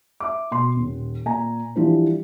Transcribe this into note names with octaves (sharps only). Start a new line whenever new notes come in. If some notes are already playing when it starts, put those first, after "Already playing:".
E5 D6
B2 C6
D#1
A#2 G#5 A#5
E3 F3 G3 D4 E4 C5